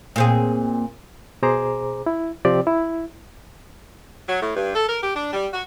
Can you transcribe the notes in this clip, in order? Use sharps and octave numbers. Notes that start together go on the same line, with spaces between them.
A#2 C4 G#4
B2 G#4 C5 A#5 D6
E4
C3 F3 C4 G4 D5
E4
F#3
A2
G2
A4
A#4
G4
D4
G3
F#4